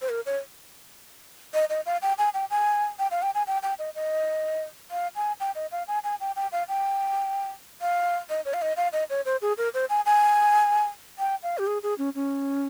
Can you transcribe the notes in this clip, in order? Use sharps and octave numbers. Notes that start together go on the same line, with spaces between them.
C5
A#4
C#5
D#5
D#5
F5
G5
G#5
G5
G#5
G5
F5
G5
G#5
G5
G5
D#5
D#5
F5
G#5
G5
D#5
F5
G#5
G#5
G5
G5
F5
G5
F5
D#5
C#5
F5
D#5
F5
D#5
C#5
C5
G#4
A#4
C5
G#5
G#5
G5
F5
G4
G#4
G#4
C#4
C#4